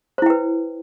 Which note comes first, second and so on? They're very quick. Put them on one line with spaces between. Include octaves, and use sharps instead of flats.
C5 E4 G5 B4